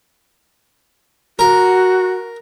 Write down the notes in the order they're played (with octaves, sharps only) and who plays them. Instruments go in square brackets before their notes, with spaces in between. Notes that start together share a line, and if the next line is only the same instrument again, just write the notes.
[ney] F#4 [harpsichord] A#4